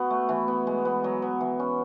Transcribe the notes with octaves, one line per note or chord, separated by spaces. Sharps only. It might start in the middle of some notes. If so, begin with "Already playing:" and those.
Already playing: B3 F#4
A3
E3
B3
G#3
B3
F#3
B3
E3
C#4